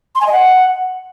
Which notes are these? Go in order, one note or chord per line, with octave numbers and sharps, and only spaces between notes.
C6
G#5
D#5
F#5